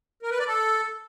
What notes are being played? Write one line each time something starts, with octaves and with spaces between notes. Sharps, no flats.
A#4
B4
D5
A4